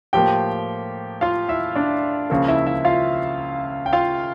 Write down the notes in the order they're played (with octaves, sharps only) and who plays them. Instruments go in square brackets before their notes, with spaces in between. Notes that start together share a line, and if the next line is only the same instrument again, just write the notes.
[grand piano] A2 F3 A#3 G4 G5
F4 F5
E4 E5
D4 D5
C#2 C#3 F3 A#3
E4 E5
E4 E5
F4 F5
G5
F4 F5